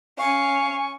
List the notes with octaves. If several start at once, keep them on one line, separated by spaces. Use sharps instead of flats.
C#4 F5 G#5 C#6